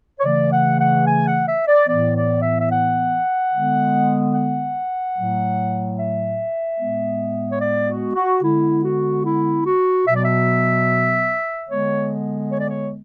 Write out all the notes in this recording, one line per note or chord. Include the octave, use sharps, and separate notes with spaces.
C#5
C#3 E3 A3 D5
F#5
F#5
G#5
F#5
E5
D5
A2 E3 B3 D5
D5
E5
E5
F#5
D3 G#3 B3
F#5
A2 F#3 A3
E5
A2 G#3 B3
C#5
D5
F#4
F#4
D3 G#3 B3 E4
F#4
E4
F#4
B2 F#3 B3 E5
D5
E5
D3 G#3 B3 C#5
C#5
D5
C#5